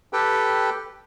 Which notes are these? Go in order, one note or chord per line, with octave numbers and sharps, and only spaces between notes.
G4 A4 B4 G5